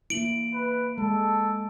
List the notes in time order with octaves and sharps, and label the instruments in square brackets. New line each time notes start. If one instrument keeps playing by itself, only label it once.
[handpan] A#3 E4 [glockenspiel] D7 F#7
[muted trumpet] B4
[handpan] G#3 [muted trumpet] A4